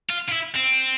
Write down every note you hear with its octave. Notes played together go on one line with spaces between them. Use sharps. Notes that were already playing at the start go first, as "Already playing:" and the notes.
F4
F4
E4
C4